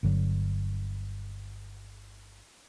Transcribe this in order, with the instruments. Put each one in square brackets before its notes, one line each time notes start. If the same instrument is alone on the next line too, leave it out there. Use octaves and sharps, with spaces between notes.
[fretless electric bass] G1 G2 D3 F#3